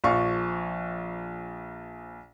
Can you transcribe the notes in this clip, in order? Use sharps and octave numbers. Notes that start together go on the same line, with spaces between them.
A#1 F3 F5 C#6